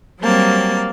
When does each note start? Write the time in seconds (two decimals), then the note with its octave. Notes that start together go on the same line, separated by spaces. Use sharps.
0.22 F#3 G3 A#3 C4 A5